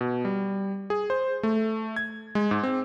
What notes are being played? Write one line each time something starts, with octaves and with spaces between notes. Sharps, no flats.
B2
G3
G#4
C5
A3
G#6
G#3
G#2
C4